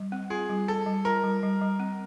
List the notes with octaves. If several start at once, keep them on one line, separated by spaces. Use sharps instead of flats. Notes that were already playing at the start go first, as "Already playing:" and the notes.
Already playing: G3
C4
F4 G#4
G3
G3 A4
G3
F4 A#4
G3
G3
G3
C4